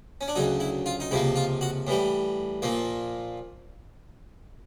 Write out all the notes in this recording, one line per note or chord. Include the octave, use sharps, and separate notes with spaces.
C#4
D4
D2 C#3 F#3 D#4
E4
F4
D#4
C#2 C3 F3 A#3 E4
F4
F#4
A2 E3 G3
A#2 F3 A#3